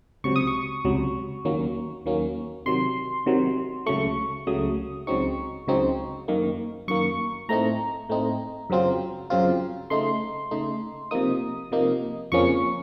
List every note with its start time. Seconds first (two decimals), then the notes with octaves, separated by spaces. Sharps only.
0.24 C#2 C3 F#3 C#6
0.36 D#6
0.47 C#6
0.85 C#2 C3 F#3
1.45 D#2 D#3 F#3 A#3 C#4
2.06 D#2 D#3 F#3 A#3 C#4
2.66 C3 D#3 F#3 C6
3.26 C3 D#3 F#3
3.86 C#2 C#3 F#3 A3 C#6
4.47 C#2 C#3 F#3 A3 D#6
5.07 C#2 C#3 F#3 C4 D#4 C#6
5.68 C#2 C#3 F#3 C4 D#4
6.28 F#2 D#3 A#3
6.88 F#2 D#3 A#3 C#6
7.49 A2 A3 C4 D#4 A#5
8.09 A2 A3 C4 D#4
8.70 F#2 C#3 F#3 C4 F4
9.30 F#2 C#3 F#3 C4 F4
9.90 C#3 A3 D#4 C6
10.51 C#3 A3 D#4
11.11 C3 F3 A#3 D#4 D#6
11.72 C3 F3 A#3 D#4
12.32 F2 C#3 F3 A#3 C#4 C#6